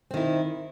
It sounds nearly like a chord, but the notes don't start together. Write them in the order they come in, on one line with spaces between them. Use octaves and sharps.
C4 D#3 E4